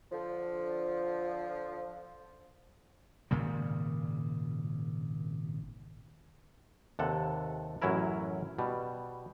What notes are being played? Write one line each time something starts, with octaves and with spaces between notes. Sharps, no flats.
D3 F3
G#1 A#2 C#3 G3
D#2 C3 A4 F#5
A1 F#2 F#3 C#4 E4 A#4
B2 G3